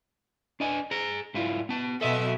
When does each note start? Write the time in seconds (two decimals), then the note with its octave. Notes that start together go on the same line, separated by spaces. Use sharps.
0.60 D4 D#5 G#5
0.91 G#4 A#5
1.34 G#2 E4 F4
1.69 B3 A5
2.01 B2 A4 D#5 E5